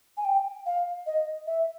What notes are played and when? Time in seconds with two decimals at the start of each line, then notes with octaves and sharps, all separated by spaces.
0.17 G#5
0.25 G5
0.66 F5
1.06 D#5
1.47 E5